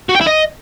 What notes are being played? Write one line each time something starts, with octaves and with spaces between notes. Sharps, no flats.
F#4
G5
E4
D#5